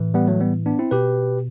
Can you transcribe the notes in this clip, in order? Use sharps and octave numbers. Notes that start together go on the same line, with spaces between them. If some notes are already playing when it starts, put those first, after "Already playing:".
Already playing: A2 E3
G3 B3
F#3 A3
G3 B3
B3 D4
C4 E4
B2 G4 B4